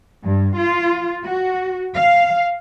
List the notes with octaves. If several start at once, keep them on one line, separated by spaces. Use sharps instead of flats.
G2
F4
F#4
F5